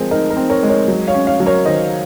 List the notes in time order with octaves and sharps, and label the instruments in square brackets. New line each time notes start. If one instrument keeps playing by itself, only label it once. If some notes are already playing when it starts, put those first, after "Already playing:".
Already playing: [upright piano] F3 G#3 C4 G#4 A#4 C5
D#4 A#4
A#4
C4
A#4 C#5
G#3
A#4 C#5
F#3
C#5 F5
C#4
C#5 F5
F#3
A#4 C#5
D#3 C5 D#5